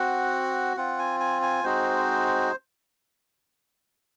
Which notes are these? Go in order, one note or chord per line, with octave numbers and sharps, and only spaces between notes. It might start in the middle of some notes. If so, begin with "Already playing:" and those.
Already playing: C4 F#4 F#5
C4 F4 F#5
G#5
G#5
G#5
G#3 C4 D#4 F#4 C5